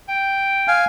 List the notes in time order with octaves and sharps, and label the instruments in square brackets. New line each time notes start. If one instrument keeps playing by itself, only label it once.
[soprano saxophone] G5
[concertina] F5 G#5